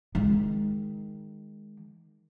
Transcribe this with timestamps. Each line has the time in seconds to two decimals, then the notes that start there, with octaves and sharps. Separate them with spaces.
0.15 D#3 G#3